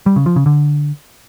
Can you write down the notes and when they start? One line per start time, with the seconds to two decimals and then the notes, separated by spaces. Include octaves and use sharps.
0.06 G3
0.16 C#3
0.26 F3
0.36 C#3
0.46 D3